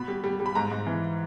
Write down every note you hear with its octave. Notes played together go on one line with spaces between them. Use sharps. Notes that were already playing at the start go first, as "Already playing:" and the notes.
Already playing: B2 B5
G3
G3
G3
B5
G#2 A#5
G#2
E3